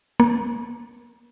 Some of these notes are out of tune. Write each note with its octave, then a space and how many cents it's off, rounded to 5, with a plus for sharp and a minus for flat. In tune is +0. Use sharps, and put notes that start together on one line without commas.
A#3 +35